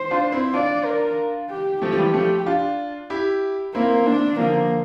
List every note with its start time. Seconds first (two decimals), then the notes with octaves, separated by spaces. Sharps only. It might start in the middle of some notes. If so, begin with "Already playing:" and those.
Already playing: C5
0.11 D4 F4
0.32 C4 E4
0.53 D4 F4 D5
0.85 A#4
1.50 G4
1.82 F3 A3 G4
1.93 F3
1.98 E3 G3
2.14 F3 A3 G4
2.46 D4 F4
3.10 E4 G4
3.74 A#3 C4 E4
4.06 D4
4.38 D3 F3 A#3